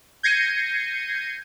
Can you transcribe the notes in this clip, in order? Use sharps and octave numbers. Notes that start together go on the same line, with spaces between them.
G6 G#6 A#6 C7 C#7 D#7